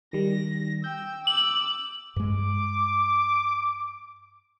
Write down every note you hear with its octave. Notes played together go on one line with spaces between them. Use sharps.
D#3 G3 A#6
G5 E6 G6
D6 E6 F#7
G2 G#3 D6